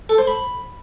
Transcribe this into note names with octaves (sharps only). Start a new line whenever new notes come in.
A4
C5
B5